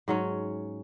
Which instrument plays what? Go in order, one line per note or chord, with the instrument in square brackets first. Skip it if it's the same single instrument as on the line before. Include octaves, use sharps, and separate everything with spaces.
[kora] G#2 F#3 C#4